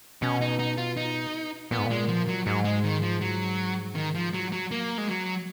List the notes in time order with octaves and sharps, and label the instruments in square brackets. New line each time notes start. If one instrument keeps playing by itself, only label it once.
[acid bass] B2 [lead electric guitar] C#4
[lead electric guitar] D#4
D#4
F4
D#4
[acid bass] A#2 [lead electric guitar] B3
[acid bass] G#2
[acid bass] A#2 [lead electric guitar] G#3
[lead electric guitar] F3
F#3
[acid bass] G#2 [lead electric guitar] F#3
[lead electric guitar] G#3
D#3
F3
F#3
D#3
F3
F#3
F#3
A#3
G#3
F#3